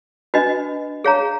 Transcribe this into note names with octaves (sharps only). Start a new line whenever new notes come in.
D4 F#4 B4 D#5
G#4 C#5 F5 A#5